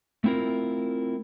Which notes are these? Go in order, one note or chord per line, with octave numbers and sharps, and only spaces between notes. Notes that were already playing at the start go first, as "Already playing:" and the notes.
A3 C4 E4 F4 A#4